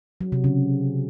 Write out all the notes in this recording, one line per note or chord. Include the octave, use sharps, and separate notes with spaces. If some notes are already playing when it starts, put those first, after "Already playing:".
F#3
C3
C#3